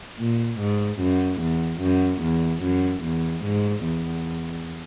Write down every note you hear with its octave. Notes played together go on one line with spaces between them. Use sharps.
A#2
G#2
F#2
E2
F#2
E2
F#2
E2
G#2
E2